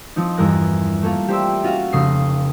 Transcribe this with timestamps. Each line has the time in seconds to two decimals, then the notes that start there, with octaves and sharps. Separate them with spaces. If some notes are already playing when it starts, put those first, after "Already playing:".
0.16 F3 C4 D#4
0.37 E2 G2 A#4 F#6 A#6
1.03 A3 A#3 F4
1.28 G4 C5 D5 E5
1.63 C#4 F4 F#4 F5
1.93 F1 C#3 D#6 C7